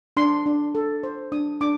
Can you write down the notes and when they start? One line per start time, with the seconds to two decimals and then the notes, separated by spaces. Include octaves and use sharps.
0.17 D4 C6
0.46 D4
0.75 A4
1.03 C5
1.32 D4 D#6
1.61 D4 D6